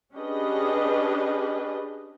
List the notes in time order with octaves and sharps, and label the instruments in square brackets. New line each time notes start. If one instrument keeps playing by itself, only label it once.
[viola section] C#4 D4 G4 G#4 B4 D#5